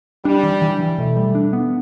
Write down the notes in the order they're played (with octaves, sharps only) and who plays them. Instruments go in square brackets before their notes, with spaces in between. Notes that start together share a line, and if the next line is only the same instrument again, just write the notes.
[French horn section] G3 [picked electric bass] D4
[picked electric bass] E3
E3
E3
[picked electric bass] B2 [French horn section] A3
[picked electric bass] G3
D4
B3